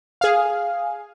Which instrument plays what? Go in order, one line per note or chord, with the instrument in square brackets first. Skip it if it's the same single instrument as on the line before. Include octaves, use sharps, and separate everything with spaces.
[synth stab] G#4 F5